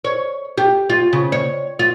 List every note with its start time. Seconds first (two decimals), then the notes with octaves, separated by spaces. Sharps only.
0.04 C#5
0.58 G4
0.90 F4
1.13 C#3
1.32 C#5
1.79 F4